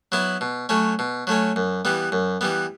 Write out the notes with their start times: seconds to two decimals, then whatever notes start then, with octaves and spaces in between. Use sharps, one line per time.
0.12 F#3 B3 E4
0.41 B2
0.69 F#3 A3 C#4
0.99 B2
1.27 F#3 A3 C#4
1.56 F#2
1.85 E3 G3 B3
2.12 F#2
2.41 E3 G3 B3